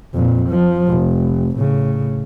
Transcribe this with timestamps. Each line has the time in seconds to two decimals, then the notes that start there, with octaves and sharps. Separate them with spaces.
0.15 F2 A#2
0.49 F3
0.88 F1
1.57 A2 C#3